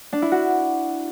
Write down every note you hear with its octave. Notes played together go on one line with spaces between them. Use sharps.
D4
E4
F#4